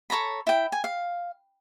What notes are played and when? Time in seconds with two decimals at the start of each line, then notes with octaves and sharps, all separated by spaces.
0.10 A4 C#5 A#5 B5
0.47 E4 G5
0.72 G#5
0.84 F5